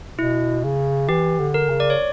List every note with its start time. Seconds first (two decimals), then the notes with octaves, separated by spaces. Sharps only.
0.18 B2 E4
0.64 C#3
1.09 E3 G4
1.39 D3
1.54 A#4
1.70 C#3
1.80 D5
1.90 C#5